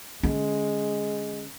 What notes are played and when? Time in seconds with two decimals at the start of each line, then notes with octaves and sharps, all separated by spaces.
0.23 D3 G#3 C#4